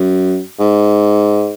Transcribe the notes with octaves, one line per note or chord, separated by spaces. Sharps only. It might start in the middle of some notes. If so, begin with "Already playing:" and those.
Already playing: F#2
G#2